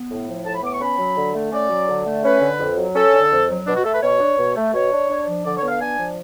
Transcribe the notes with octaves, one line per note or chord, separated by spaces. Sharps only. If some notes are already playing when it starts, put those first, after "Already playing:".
Already playing: B3
A2
F3
A2 A5
B5
B3 D6
C#6
C#4 B5
F#3
D3
A3
C#4 D5
F#3
D3
A3
C#4 B4
D3
F2
F#3
C#4 A4
D3
F2
F#3
B2 D4
F#4
A3 A4
B4
B2 C#5
D4
B2
A3
B2 C#5
D4
D4
F3
D3 D5
C#5
B3
F5
D4 G#5
F3